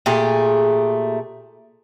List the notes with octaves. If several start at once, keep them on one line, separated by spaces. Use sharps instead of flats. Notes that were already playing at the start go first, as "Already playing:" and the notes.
A#2 A3 G4 G#4